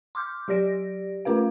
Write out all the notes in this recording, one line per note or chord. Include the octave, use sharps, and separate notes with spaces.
C6 D6 F6 G6
F#3 G4 D5 A#6 D7
A3 C#4 F4 A#4 B4 F5